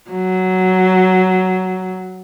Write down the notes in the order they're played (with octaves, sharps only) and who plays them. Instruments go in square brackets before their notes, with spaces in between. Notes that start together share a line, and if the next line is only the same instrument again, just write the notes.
[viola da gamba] F#3